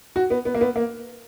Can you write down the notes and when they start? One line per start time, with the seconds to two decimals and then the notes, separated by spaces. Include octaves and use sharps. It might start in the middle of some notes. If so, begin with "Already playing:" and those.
0.16 F#4
0.30 B3
0.45 B3
0.55 A#3
0.61 B3
0.76 A#3